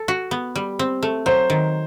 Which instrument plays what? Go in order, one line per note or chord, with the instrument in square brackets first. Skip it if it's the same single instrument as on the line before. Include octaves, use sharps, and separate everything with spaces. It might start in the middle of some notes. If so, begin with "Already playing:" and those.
Already playing: [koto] A4
F#4
B3
G3
C4
A3
[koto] F#3 [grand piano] C5
[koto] D#3